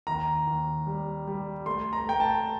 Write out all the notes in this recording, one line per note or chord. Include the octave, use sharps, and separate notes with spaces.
D#2 A#5
D#2
G3
G3
A3 C6
A#5
A3 G5
A5